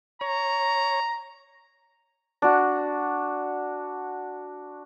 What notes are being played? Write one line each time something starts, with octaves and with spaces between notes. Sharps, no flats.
C#5 A#5
D4 F#4